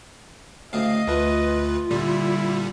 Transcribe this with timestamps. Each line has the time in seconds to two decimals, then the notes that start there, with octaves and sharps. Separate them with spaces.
0.73 D2 A2 C#3 D#5 F5
1.07 D2 A3 F4 B4
1.90 A#2 D3 G3 E4